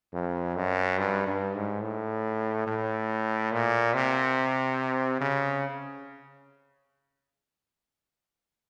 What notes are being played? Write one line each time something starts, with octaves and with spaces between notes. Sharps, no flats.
F2
F#2
G2
G2
G#2
A2
A2
A#2
C3
C#3